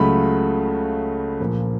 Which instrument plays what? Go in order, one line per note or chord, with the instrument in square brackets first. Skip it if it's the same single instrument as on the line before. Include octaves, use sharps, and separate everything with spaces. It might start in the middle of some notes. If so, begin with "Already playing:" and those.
Already playing: [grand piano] C#2 C#3 F#3 A3 B5
A#1 A#2 F3 A#3